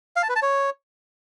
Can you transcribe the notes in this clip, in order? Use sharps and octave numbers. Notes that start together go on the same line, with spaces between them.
F5
A5
B4
A5
C#5